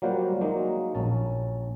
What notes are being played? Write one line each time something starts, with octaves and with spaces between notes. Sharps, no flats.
F#3 G3 A#3 F4 C5 F#5
F#3 G#3 A#3 D#4
A#1 C#4 A5